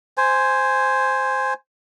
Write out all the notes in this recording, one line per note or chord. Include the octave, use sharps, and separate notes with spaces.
C5 G#5